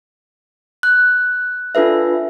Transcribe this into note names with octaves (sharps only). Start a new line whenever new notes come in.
F#6
D4 F4 A4 B4 E5